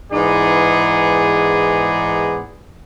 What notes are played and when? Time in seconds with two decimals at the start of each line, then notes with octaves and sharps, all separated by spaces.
0.12 G#2 E3 B3 D#4 G#4 D5